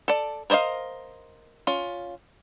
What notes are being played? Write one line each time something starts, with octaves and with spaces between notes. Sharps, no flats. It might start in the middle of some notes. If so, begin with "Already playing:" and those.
A4 D5
A#4 C5 D5 D#5 F5
C#4 F4